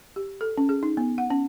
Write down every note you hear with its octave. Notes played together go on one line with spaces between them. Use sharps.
G4
A4
C#4
G#4
D#4
B3
F#5
C#4